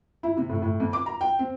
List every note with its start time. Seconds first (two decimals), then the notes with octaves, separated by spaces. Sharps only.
0.23 E4
0.37 C3
0.50 A2
0.62 A2
0.80 F2
0.93 D6
1.06 A#5
1.21 G5
1.39 C4